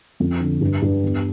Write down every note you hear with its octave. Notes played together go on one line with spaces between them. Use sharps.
F2
D3
G2
G2
E2